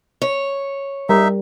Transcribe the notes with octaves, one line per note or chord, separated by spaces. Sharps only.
C#5
G3 D#4 A#4 E5